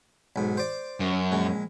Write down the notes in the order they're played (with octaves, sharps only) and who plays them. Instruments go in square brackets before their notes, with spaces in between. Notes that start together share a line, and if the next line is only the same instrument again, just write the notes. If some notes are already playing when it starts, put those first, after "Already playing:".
[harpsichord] B1 G#2
C5 D5
[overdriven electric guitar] F#2
[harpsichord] A#1 G#3